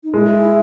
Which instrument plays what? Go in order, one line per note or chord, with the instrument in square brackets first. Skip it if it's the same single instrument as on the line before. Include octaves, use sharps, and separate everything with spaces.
[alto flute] D#4
[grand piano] G#3 [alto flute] E4